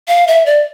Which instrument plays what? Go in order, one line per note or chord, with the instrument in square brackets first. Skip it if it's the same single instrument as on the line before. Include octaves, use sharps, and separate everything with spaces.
[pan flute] F5
E5
D5